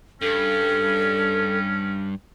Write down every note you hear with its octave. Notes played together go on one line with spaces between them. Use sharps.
G2 C#4 A4